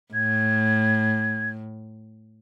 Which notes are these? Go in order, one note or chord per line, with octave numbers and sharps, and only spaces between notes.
A2 G#6